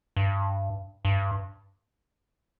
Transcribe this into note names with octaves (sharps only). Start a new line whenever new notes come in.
G2
G2